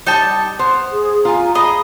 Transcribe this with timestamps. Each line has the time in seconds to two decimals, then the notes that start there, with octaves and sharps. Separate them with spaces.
0.06 G3 D#4 G5 A5
0.59 B3 C5
0.92 G#4
1.25 F4 G#5 A#5
1.55 G#4 D#5 B5